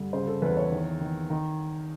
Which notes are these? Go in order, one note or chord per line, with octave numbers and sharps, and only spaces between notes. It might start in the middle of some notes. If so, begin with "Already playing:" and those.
Already playing: G2 D3
C#3 C5
A4
E2 B4
C#5
D#3
D#3
D#3